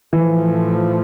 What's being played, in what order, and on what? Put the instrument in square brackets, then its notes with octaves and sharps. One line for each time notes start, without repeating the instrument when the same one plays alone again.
[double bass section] A2 F3 A3 [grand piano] E3